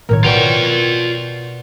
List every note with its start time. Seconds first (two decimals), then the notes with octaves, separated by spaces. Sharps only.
0.09 A2 D#3 A#4 C#5
0.24 B2 E4 F4 D5 G5 C#6